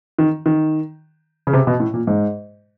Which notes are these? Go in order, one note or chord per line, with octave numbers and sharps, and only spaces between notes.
D#3
D#3
C#3
C3
B2
A2
A#2
G#2